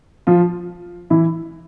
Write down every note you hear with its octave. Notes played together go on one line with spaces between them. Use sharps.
F3 F4
E3 E4